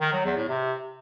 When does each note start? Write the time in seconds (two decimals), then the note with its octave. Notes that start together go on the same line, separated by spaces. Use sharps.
0.01 D#3
0.13 F#3
0.25 E2
0.37 A2
0.49 C3